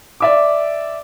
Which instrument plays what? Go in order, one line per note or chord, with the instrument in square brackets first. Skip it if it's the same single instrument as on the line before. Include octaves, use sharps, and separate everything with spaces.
[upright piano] D5 E5 D6